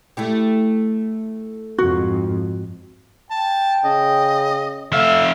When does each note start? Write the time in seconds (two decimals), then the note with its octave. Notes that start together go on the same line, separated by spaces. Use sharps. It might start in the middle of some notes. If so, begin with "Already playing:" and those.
0.17 A3 E4 G4
1.78 F2 G#2 F#4
3.31 G5 A5
3.85 C#3 D#5
4.92 F2 A3 E5 F5